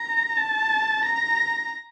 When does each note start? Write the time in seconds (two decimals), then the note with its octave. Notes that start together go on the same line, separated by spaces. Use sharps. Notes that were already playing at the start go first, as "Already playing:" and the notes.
Already playing: A#5
0.37 A5
1.05 A#5